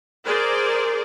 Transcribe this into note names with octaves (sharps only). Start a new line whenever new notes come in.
G#4 A#4 C5 D5